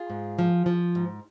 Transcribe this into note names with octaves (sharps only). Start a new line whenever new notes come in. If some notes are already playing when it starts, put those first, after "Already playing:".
Already playing: F4 G#4
G#2
F3
F3
G#2